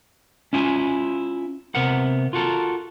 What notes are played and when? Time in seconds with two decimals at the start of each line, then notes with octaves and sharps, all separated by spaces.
0.53 C#4 E4 F4 G#5
1.75 C3 B3 A#4 F#5
2.33 F4 F#4 A4 A#4